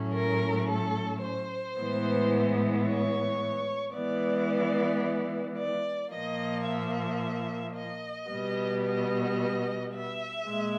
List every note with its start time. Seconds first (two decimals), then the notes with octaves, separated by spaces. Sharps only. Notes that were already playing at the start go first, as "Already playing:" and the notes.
Already playing: A2 F#3 A3 C#4
0.13 A#4
0.68 A4
1.22 C5
1.77 A2 E3 G#3 B3
2.86 C#5
3.94 E3 G#3 B3 D5
5.57 D5
6.12 A#2 F3 A#3 D#5
6.67 E5
7.76 D#5
8.30 B2 G3 B3
8.85 D#5
9.94 E5
10.48 A#2 G#3